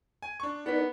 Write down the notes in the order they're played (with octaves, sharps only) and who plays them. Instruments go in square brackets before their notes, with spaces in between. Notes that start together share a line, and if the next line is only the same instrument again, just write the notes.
[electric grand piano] G#5
D4 C#6
[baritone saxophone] B3 [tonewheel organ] D#4 A#4 D5 [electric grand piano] F#5 B6